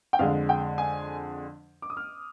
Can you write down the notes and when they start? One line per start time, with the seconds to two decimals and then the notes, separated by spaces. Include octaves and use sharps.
0.13 G5
0.19 F2 D3 G#3 F5
0.49 G5
0.78 G#5
1.82 D6
1.90 D#6
1.97 F6